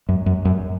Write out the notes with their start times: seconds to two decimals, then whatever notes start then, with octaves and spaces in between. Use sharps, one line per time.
0.09 F#2
0.26 F#2
0.45 F#2